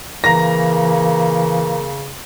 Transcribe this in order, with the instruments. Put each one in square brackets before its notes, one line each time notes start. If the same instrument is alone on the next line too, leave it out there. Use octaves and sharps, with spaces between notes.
[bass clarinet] C#3 [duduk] E3 [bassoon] A#3 [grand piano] A#5 A#6